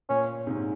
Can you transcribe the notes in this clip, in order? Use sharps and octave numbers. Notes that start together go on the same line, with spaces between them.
A#2 C#4
G#2 C3